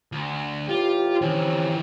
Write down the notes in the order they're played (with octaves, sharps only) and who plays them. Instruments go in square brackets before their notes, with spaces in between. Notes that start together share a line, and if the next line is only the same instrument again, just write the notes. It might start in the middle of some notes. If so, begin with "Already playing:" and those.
[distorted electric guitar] D2
[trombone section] A1 G4 [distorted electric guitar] F4
[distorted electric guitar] D#3 E3 [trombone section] C4 C#4 G4